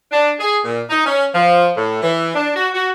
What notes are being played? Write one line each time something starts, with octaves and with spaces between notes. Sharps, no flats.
D4
G#4
A#2
D#4
C#4
F3
A2
E3
D4
F#4
F#4